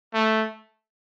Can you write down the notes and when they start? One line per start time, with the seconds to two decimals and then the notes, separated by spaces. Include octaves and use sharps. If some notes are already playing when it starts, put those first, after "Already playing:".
0.14 A3